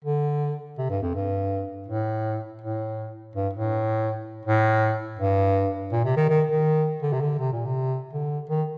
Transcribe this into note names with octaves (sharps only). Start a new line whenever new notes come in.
D3
C3
G2
F2
G2
A2
A2
G2
A2
A2
G2
A#2
C3
D#3
D#3
D#3
D3
C3
D3
C3
A#2
C3
D3
D#3